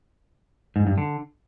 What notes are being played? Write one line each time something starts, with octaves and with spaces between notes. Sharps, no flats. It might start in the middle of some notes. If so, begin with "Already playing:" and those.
G#2
G2
D3